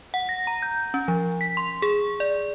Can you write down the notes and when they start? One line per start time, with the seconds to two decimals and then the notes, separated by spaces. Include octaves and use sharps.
0.14 F#5
0.29 A#6
0.47 A#5
0.62 G6
0.94 C#4
1.08 F3
1.41 B6
1.57 C6
1.82 G#4
2.20 D5